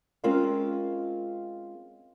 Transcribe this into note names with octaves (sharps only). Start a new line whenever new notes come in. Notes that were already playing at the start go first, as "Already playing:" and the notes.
G#3 C4 C#4 F4 A#4 F5